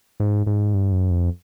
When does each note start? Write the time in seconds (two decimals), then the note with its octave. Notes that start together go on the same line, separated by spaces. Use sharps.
0.20 G#2
0.47 G#2
0.74 G2
0.92 F#2
1.10 F2